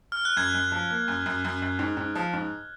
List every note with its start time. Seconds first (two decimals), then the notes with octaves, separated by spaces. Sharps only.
0.12 F6
0.25 F#6
0.37 F#2 G#6
0.54 F#2
0.72 F3
0.90 A#3
1.08 F#2
1.26 F#2
1.44 F#2
1.62 F#2
1.79 G#2
1.97 G#2
2.15 F3
2.33 G#2